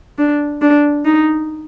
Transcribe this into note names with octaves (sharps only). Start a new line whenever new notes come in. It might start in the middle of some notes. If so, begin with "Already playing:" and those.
D4
D4
D#4